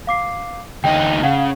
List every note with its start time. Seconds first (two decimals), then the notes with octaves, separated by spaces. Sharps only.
0.07 F5 D6 C7
0.84 D2 D#4 G5
1.23 C#3 F5 F#5